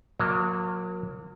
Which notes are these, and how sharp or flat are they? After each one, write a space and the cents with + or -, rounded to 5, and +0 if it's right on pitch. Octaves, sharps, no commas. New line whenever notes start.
F#3 -35 A#3 +0